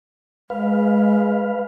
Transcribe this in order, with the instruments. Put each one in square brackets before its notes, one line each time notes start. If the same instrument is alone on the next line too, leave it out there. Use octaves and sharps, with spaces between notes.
[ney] G#3 [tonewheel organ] B4 F5